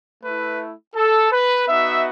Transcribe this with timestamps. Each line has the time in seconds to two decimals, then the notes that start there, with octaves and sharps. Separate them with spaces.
0.23 A3 E4 B4
0.95 A4
1.32 B4
1.68 B3 D#4 F#4 E5